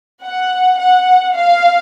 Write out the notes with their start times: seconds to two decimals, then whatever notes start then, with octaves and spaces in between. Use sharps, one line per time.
0.24 F#5
0.79 F#5
1.36 F5